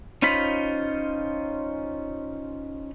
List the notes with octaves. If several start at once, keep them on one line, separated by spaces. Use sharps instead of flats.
C#4 D#4 F4 C5 B5